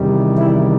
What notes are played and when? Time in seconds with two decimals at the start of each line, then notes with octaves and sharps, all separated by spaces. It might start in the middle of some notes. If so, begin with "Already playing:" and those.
Already playing: E2 C3 D#3 G3
0.38 E4